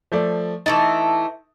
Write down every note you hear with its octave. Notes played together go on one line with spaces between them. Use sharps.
F3 A3 D5
E3 A3 D#4 A5